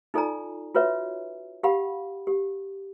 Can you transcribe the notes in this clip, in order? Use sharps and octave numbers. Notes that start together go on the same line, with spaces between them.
D#4 F4 A4 D5 G#5 A#5
F4 F#4 B4 C#5 E5
G4 F5 F#5 B5
G4